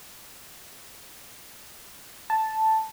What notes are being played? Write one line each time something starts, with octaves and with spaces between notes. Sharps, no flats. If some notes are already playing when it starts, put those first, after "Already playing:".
A5